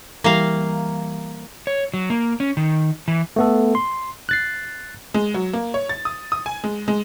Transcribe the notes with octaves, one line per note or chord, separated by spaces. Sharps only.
E3 G3 A#3 F5 A#5
C#5
F#3
A#3
C#4
D#3
E3
A3 B3 A4
C6
F#6 A6 C7
G#3
F#3
A#3
C#5
A6
D#6
D#6
G#5
G#3
G#3